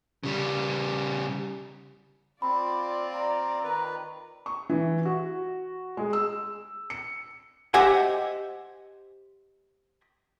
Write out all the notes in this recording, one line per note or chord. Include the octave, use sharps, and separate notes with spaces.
C#3 G3
C4 F4 D5 B5
A#5
D#3 B4
C#6
E3
F#4
G#3
E6
C#7
G4 C5 D#5 E5 F#5 G#5